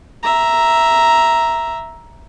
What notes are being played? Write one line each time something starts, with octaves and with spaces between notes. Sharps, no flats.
E5 A#5